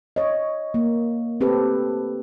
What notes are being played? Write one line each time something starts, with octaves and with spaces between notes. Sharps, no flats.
C#5 D#5
A#3
C4 G4 A4 B4